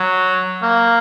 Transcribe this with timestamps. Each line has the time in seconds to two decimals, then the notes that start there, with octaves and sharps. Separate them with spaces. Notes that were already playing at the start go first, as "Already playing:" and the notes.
Already playing: F#3
0.63 A#3